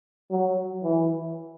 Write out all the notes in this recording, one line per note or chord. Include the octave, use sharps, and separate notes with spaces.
F#3
E3